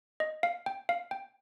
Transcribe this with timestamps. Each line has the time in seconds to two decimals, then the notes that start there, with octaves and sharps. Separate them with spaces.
0.20 D#5
0.43 F5
0.66 G5
0.89 F5
1.11 G5